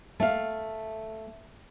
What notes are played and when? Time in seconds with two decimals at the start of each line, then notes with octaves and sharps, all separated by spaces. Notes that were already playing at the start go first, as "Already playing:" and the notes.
0.20 A3 F5